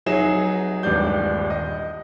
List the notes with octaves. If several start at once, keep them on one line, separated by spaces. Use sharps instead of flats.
F1 F#3 D#4 G#4 E5 E7
D#1 A1 G2 G#3 D5 G6
D#5